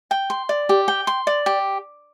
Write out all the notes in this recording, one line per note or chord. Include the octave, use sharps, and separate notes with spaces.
G5
C6
D5
G4
G5
C6
D5
G4